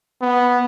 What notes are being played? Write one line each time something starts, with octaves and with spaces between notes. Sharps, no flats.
B3